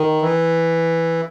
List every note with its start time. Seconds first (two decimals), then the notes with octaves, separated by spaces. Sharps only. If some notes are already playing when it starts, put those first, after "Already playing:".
Already playing: D#3
0.22 E3